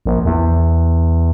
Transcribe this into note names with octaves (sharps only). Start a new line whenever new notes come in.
A#1
E2